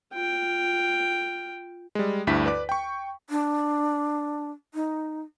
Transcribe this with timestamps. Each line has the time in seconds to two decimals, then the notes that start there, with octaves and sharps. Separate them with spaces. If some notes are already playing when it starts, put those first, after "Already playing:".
0.13 F4 G5
1.95 G3 G#3
2.27 D2 G2 E4 B6
2.46 B4 D5 D6
2.69 G5 C#6
3.30 D4
4.74 D#4